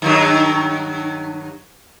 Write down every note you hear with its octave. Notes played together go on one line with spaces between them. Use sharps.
G2 D#3 F#3